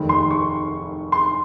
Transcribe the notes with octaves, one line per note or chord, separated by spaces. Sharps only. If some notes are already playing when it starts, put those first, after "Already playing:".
Already playing: F1 D#2 D#3
C6
C#6
C6